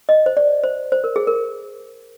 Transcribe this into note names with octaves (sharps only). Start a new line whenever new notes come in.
D#5
C5
D5
C5
C5
A#4
G#4
A#4